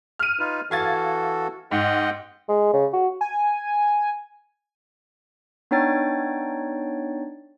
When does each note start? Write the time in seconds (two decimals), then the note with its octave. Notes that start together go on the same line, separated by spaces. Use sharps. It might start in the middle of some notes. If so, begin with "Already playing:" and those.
0.19 F6 D#7
0.39 D#4 F4 B4
0.71 E3 F#4 A4 F5 G#6 A6
1.71 G#2 D#5 F#5 G5
2.49 G#3
2.73 C#3
2.93 F#4
3.21 G#5
5.71 B3 D4 D#4 C#5 G5 A6